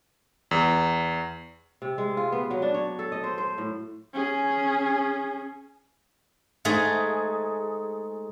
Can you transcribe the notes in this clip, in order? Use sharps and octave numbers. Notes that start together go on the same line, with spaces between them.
E2
C3
G#3
F4
B3
F#3
D4
C#5
A4
D#5
C5
C5
A2
C#4 G#4
G#2 A3 G#4